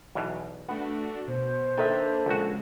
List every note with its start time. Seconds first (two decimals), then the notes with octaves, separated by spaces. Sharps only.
0.15 B1 E2 B2
0.68 A3 B3 D4 F#4
1.28 B2 C5
1.77 D#3 A#3 D4 A4 B4 E5 A#5
2.26 A#1 C#3 G#3 F#4